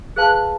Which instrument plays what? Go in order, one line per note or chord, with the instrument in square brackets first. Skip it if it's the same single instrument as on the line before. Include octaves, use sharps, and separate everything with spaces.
[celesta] G#4 B4 F5 A5 [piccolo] F#6